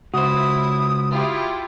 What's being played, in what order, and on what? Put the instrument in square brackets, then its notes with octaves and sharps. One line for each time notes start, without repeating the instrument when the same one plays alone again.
[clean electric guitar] C#2 C5 [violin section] E4 [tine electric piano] F#4 [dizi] D#6
[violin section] E4 F4 G4